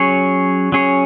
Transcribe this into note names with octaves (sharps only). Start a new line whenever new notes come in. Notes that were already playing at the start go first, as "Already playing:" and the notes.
Already playing: F#3 C#4 G#4 C#5
F#3 C#4 G#4 C#5